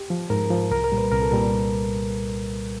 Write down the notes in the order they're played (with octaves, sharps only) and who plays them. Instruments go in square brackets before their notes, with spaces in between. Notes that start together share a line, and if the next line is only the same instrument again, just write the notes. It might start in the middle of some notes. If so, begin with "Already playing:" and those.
Already playing: [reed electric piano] G4
F3
G#2 A#4
F3
C2 A#4
A#4
A#2 G3
B4
C2 A#4
A4
A#2 G3 A#4